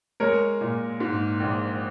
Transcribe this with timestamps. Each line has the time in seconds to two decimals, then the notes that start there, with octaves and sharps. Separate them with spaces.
0.20 G#3 A#4 C#5
0.61 A#2
1.00 G#2
1.40 A#1